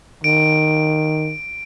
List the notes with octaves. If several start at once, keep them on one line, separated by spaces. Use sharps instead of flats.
D#3 D7